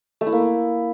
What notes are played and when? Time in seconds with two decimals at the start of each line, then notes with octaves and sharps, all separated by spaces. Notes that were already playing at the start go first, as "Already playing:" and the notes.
0.21 A3
0.27 E4
0.32 A#3